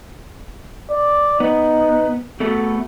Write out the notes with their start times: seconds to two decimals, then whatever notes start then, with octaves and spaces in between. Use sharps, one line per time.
0.90 D5
1.40 B3 D#4
2.40 A3 B3 F#4 A4